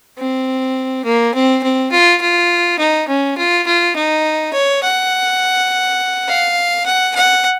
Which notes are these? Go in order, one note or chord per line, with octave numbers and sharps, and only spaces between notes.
C4
A#3
C4
C4
F4
F4
D#4
C#4
F4
F4
D#4
C#5
F#5
F5
F#5
F#5